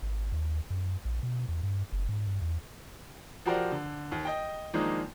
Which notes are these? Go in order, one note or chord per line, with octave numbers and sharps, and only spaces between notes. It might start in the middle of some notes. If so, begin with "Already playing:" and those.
G#1
D#2
F#2
A#1
B2
E2
G2
F#1
G#2
G2
E2
F3 F#4 G4 A#4 C5 D5
D3
D#2
D#5 G5
D#3 F3 G#3 A#3 D4 D#4